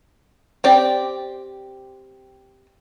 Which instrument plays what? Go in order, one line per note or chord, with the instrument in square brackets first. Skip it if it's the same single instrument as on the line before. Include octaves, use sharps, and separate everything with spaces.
[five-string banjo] C4 G4 D5